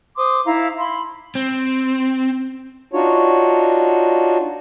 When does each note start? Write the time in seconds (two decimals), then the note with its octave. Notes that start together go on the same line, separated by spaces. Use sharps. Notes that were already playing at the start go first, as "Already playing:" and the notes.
0.17 C5 C6 D6 D#6
0.45 D#4 E4 F5 A#5
0.79 B5 C6
1.35 C4
2.93 D4 D#4 F4 F#4 C#5